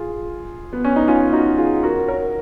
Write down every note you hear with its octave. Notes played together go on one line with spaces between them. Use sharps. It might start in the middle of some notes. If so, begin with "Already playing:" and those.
Already playing: F4 G#4
B3
C#4
D#4
C#4 F4
D#4 F#4
F4 G#4
F#4 A#4
A#4 C#5